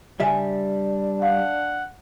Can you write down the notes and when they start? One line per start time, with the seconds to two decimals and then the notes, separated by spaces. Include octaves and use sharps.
0.20 C#3 G3 D4 E5 G#5
1.22 F5 F#5